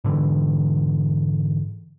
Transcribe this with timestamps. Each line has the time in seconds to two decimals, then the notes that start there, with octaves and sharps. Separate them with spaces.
0.04 G#2 D3 E3